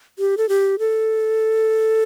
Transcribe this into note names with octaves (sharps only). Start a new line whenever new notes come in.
G4
A4
G4
A4